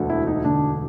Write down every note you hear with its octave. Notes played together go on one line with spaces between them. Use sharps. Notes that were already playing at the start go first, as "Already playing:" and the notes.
Already playing: E1 D2 D3
E4
D#4
E1 D2 D3 D4